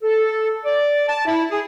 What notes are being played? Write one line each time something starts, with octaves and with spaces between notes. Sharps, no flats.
A4
D5
A5
E4
G#4